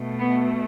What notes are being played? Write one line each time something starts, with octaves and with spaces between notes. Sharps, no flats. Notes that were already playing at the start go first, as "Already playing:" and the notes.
Already playing: B2 A3
B3